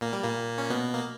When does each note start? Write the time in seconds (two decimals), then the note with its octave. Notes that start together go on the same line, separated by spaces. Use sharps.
0.01 A#2 A#3
0.13 G3
0.24 A#2 A#3
0.58 C#4
0.70 B2 B3
0.94 A#3